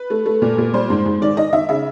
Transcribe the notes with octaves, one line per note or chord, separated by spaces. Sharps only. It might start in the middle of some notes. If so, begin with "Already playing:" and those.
Already playing: B4
A3
A3
A#2
A#2
G3 C5
G#2
G#2
D#3 D5
D#3 D#5
D#3 E5
C#3 E5